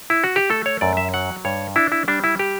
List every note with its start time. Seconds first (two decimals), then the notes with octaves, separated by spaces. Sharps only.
0.10 E4
0.24 F#4
0.36 G4
0.50 A3 A4
0.66 C#5
0.81 F#2 D5
0.97 E5
1.14 F#3 F#5
1.45 G2 C#5
1.76 D4 E4
1.92 E4
2.08 G3 D4
2.24 E4
2.39 G4